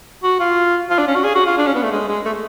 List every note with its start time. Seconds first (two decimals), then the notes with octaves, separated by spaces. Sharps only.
0.23 F#4
0.40 F4
0.90 F4
0.98 D4
1.08 C#4
1.15 F#4
1.24 G#4
1.35 F#4
1.46 F4
1.58 D4
1.67 C#4
1.75 B3
1.83 A3
1.92 G#3
2.08 G#3
2.25 A3